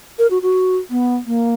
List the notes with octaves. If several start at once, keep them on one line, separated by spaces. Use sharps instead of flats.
A#4
F#4
F#4
B3
A#3